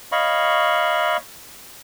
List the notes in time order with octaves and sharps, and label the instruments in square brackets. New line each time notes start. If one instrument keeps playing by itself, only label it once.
[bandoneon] C#5 D#5 F5 B5 C#6